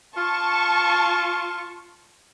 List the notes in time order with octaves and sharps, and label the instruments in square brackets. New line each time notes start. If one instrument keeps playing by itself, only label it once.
[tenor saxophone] F4 [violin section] A5 C#6